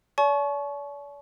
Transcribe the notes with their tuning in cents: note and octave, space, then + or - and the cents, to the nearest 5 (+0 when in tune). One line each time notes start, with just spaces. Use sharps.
D5 -45 A5 -45 C#6 +0